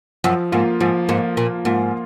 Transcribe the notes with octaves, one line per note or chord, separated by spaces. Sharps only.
F#2 F3
G#2 A#3 F4
G#2 F3
G#2 A#3 F4
A#2 F3
G#2 A#3 F4